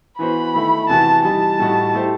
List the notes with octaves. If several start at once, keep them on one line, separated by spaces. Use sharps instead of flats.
E3 B3 F#4 C5 B5
D#3 A3 E4
E2 C3 E3 B3 F#4 A5
E3 G3 D#4 A5
A2 G3 D#4 F#4
A3 E4 G4 C5